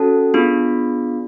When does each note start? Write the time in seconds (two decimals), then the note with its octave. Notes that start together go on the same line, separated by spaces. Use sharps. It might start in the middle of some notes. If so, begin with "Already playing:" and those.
Already playing: C#4 F#4 A4 A5
0.34 B3 D4 F4 G#4